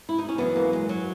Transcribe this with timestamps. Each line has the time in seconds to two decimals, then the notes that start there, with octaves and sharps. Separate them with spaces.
0.09 E4
0.18 D#4
0.29 C#4
0.38 F#2 C#3 E3 B3
0.56 A#3
0.73 G#3
0.89 F#3